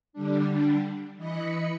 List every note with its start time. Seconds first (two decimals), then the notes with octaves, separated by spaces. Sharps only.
0.13 D3 G3 D4
1.16 E3 D#5 B5 C#7